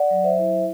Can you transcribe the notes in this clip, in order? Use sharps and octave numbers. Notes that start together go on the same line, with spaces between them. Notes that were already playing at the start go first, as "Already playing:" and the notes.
Already playing: D5 F#5
F#3
C5 E5
E4